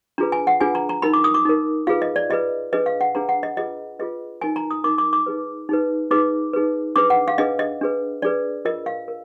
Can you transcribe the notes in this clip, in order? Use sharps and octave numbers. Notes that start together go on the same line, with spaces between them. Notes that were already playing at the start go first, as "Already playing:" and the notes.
D4 F4 G#4 B4 A#5
G#5
F#5
D4 F4 G#4 B4 G#5
A#5
A#5
D#4 A#4 B5
D6
D#6
D6
D#4 A#4
F4 G#4 B4 F5
D#5
D5
F4 G#4 B4 D#5
D4 G#4 B4 D#5
F5
F#5
D4 G#4 B4 A#5
F#5
D#5
F4 G#4 B4 D#5
F4 G#4 B4 D#5
D#4 A#4 G#5
A#5
D#6
D#4 A#4 D6
D6
D6
D#4 G#4 B4
D#4 G#4 B4
D#4 G#4 B4 D6
D#4 G#4 B4
D4 G#4 B4 D6
F#5
F5
D4 G#4 B4 D#5
D#5
D4 G#4 B4
D4 G#4 B4 D5
F4 A#4 D#5
F5
A#4